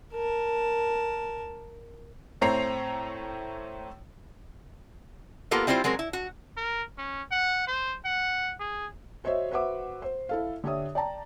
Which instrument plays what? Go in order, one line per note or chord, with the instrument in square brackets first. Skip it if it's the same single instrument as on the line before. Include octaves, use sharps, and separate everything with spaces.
[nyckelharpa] A#4 A5
[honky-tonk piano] A2 A3 C4 C#5 A#5 C7
[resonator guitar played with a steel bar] A#3 B3 F4 G4 A4 A#4
G3 C4 E4 F4 C5
F#3 G#3 C4 A#4
E4
F#4
[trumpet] A#4
C#4
F#5
C5
F#5
G#4
[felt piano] F#4 C5 C#5 D#5 E5
F#4 B4 C5 E5 F#5 D6
C5
E4 A4 F5
D3 G4 C#5 E5 D#6
D5 G5 A5 A#5